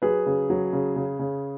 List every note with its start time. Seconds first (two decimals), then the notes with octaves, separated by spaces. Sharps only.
0.02 F#3 G#4 B4
0.26 C#3
0.50 F#3
0.73 C#3
0.96 C#3
1.19 C#3